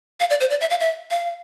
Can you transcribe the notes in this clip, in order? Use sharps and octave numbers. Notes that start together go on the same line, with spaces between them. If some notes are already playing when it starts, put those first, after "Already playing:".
F5
D5
C5
D5
E5
F5
E5
F5